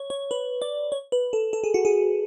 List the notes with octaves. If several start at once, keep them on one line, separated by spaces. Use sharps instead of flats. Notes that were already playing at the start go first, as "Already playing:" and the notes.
Already playing: C#5
C#5
B4
D5
C#5
B4
A4
A4
G#4
F#4
G#4